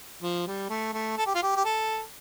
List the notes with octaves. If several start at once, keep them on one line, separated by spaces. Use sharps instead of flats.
F3
G3
A3
A3
A4
G4
F4
G4
G4
A4